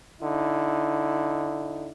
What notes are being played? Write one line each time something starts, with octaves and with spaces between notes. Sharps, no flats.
D3 D#4 E4